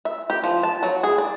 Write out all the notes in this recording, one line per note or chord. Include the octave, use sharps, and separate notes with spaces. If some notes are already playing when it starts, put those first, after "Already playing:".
E5
G4
F3
A5
F#3
G#4
D5